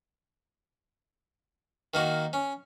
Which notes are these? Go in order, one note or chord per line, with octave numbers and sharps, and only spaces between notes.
D#3 A#3 F#4
C#4